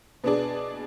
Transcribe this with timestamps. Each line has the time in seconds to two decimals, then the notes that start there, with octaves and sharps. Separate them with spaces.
0.24 B2 B3 D4 G#4 D5